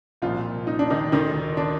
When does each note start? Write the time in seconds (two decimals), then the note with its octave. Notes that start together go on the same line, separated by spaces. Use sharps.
0.22 C2 A#2 F3 F4
0.67 D#4
0.79 D4
0.90 D#3 D#4
1.12 D2 D3 D#3 D#4
1.57 D3 D4